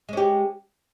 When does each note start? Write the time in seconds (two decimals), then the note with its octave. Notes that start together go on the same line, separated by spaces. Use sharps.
0.09 G#3
0.13 C#4
0.17 G4